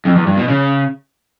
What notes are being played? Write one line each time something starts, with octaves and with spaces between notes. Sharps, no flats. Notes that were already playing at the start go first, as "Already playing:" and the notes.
F2
E2
G2
B2
C#3